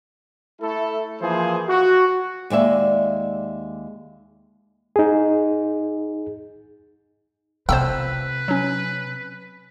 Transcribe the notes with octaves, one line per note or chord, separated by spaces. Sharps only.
A3 E4 A4
E3 F3 A#3 G#4 C5
F#4
D#2 G#3 D5 E5
D#4 G#4
C3 F3 A3 B4 C5 G5 E6
F#3 C#4